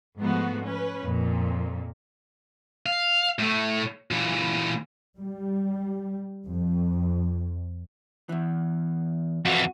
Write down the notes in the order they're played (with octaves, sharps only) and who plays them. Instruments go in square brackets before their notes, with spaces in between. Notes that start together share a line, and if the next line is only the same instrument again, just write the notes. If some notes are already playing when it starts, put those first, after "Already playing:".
[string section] G#2 F3 A3 B3 F#4
C#4 B4
F2 A#2
[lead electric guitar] F5
A2 A3
A#2 E3
[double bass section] G3
F2
[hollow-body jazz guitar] E2 E3
[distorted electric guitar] F2 E3 [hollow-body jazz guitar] F#4